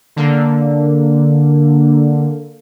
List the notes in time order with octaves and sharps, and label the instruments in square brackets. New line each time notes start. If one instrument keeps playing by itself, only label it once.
[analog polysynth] D3 A#3